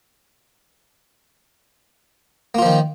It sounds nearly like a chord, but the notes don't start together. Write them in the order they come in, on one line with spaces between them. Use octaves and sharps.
A#3 F4 F3 D#3